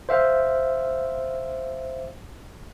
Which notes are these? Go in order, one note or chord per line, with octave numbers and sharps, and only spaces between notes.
C5 E5 F5